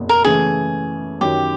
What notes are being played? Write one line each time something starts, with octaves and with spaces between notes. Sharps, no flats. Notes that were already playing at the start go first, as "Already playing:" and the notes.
Already playing: F#1 E2 B2 A#3
A#4
C#3 E3 A3 G#4
F#2 D#3 F#3 G4